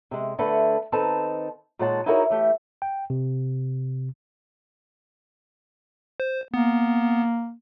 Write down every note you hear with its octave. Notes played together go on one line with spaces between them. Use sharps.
C3 G#3
D3 A3 A4 B4
D#3 C4 D#4 A4 B4 A5
A#2 D#3 G#3 C#5 F#5 A5
D#4 E4 F#4 G#4 A#4 C#5
E3 A3 G4
G5
C3
C5
A#3 B3